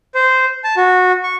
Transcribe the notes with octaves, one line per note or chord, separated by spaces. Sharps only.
C5
A5
F#4
C#6